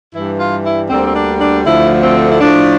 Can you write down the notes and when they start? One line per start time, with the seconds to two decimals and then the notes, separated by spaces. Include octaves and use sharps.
0.14 G2 E3 G3 E4
0.39 F4
0.64 E4
0.90 D2 D3 G3 A#3 C4
1.07 C4
1.14 D4
1.40 D4
1.65 D2 D3 F3 A3 E4
2.02 C4
2.30 E4
2.40 A2 F3 A3 D4